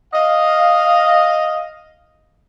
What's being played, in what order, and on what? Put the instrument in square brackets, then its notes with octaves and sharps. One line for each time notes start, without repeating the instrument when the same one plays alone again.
[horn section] D#5 F5